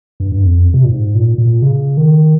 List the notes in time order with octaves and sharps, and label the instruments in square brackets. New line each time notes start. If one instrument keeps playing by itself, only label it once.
[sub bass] G2
G2
F2
C3
A#2
G#2
A#2
A#2
C#3
D#3